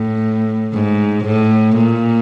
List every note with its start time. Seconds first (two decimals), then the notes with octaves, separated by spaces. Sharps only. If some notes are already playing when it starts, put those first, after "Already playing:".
Already playing: A2
0.74 G#2
1.25 A2
1.77 A#2